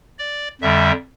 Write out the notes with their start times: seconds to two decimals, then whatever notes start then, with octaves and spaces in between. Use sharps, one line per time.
0.19 D5
0.61 F2 D3 G3 E5